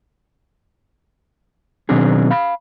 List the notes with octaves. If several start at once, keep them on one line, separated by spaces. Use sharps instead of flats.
B2 D#3 F#3 C4 D4 G#4
F5 B5